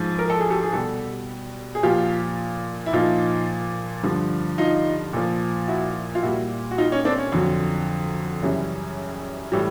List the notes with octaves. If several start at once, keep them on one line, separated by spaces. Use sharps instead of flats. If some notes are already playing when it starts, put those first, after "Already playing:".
Already playing: G#2 F3
A#4
A4
G#4
G4 A4
G#4
B2 G3 G4 A4
G#4
A#2 F3 F4 G4
E4
A#2 F3 D#4 F4
G2 D3 F3
D#4 F4
A#2 F3
E4 F#4
F4
A#2 G3 E4 F#4
F#4
D#4 F4
C#4 D#4
C4 D4
C#4
F2 D3 F#3
F#2 C#3 E3 G3
A2 E3 G3